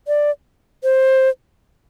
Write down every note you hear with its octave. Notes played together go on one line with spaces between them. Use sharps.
D5
C5